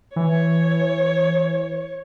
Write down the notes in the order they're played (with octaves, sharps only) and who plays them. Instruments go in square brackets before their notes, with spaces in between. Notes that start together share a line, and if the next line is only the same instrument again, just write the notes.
[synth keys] E3 [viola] C#5